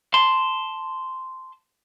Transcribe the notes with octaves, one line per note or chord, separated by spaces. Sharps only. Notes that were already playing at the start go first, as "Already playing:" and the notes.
A5 C6